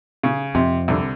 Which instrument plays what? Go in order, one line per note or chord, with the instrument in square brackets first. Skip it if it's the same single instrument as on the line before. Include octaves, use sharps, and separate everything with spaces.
[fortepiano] C#3
[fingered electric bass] F2 [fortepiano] C3
[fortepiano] C2 D3